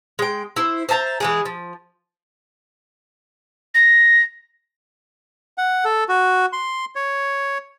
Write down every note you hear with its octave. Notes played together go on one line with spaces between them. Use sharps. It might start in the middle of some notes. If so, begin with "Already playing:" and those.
G#3 G5
E4 C5
C5 E5 A5 A#5
E3 G#3 G#4
F3
A#6
F#5
A4
F#4
C6
C#5